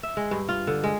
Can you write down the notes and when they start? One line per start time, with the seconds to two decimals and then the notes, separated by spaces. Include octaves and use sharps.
0.03 E5
0.17 G#3
0.31 G2
0.49 F4
0.67 D3
0.84 G#3